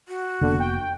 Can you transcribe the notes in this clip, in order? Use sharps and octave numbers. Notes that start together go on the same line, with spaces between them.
F#4
F1 D3 A#3 B3
G5